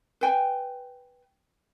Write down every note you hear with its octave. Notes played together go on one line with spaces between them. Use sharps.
B4 G5 G#5